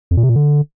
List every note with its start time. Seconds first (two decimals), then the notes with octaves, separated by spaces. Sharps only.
0.11 F2
0.17 A#2
0.23 C3
0.29 A#2
0.36 D3